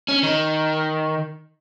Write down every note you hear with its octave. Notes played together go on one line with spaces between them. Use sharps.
C#4
D#3